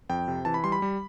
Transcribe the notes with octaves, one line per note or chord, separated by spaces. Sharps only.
F2 G5
C3
E3 A5
B5
G3 C6
B5
G3